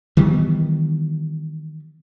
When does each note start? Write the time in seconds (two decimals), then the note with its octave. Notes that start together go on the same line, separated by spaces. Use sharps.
0.17 D#3 E3 G3 B3